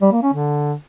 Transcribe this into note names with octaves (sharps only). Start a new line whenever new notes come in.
G3
A#3
C#4
D3